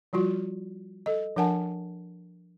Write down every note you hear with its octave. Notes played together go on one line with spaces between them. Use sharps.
F3 G3 F4 F#4
A4 D#5
F3 D4 A#4 F#5 G#5 A5